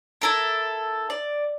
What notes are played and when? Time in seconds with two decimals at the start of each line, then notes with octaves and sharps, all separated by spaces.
0.22 E4 A4 A#4
1.10 D5